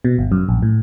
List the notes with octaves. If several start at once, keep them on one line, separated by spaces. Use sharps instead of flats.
B2
G1
F#2
A#1
A2